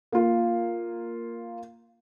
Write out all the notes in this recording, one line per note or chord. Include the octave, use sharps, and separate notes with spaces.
A#3 F4